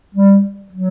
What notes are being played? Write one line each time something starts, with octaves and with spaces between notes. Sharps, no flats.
G3
F#3